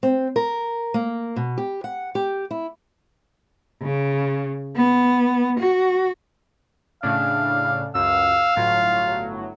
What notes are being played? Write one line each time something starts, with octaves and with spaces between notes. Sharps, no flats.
C4
A#4
A#3
B2
G4
F#5
G4
E4
C#3
B3
F#4
A2 C#3 D4 F5
C#2 F#2 F5 E6
G1 A2 F#3 F4